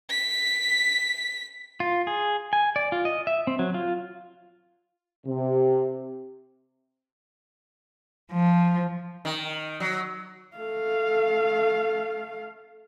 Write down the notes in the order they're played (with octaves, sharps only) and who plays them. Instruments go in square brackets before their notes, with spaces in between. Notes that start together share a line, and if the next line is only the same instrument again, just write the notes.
[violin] B6
[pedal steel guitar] F4
G#4
G#5
D5
F4
D#5
E5
C4
F#3
F4
[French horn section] C3
[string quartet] F3
[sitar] D#3
F#3
[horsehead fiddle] A3 F5